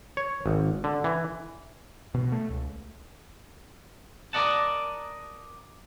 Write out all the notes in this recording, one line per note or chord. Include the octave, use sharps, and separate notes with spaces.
C#5
G#1
D3
E3
B2
A3
C#2
A#4 D5 D#5 F#5 A5